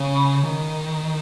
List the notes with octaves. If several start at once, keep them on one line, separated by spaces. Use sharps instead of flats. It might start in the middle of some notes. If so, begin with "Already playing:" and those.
Already playing: C#3
D#3